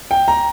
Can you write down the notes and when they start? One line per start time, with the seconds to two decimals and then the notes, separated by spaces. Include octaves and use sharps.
0.11 G5
0.28 A#5